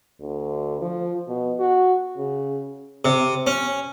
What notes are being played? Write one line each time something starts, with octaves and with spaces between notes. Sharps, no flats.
D2
F3
B2
F#4
C#3
C3
C#4